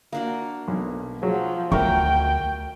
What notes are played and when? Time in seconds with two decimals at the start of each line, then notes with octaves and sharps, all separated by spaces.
0.12 A#3 D4 F#4
0.68 B1
1.22 F3 F#3 G#4
1.72 D2 F#3 A#4 E5 G5 C#6